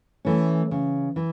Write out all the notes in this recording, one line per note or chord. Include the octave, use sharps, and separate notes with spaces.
E3 A3 C#4
C#3
E3